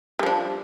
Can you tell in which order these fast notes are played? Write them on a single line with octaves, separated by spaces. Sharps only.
G3 F3 D4